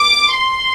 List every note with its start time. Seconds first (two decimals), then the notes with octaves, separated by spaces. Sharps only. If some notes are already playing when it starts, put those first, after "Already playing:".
Already playing: D6
0.36 C6